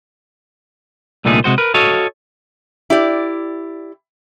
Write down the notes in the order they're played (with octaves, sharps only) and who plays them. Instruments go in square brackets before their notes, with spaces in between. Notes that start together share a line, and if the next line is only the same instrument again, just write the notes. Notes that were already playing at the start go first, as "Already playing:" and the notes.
[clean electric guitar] C2 A#2 D3 A3 D#4 G#4
C3 G#3 F#4 C5
A#4 B4
F#4 A4 C#5 D#5 F5
[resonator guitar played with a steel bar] E4 G4 D5